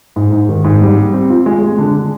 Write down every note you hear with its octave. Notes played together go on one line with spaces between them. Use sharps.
G#2
G#2
D#3
G#2
G3
G3
C4
F4
G#3
G#3
D3
D3